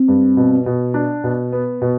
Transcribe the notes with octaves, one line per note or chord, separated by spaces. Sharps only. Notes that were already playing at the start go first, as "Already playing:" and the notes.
Already playing: C4
G2
B2
B2
D4
B2
B3
B2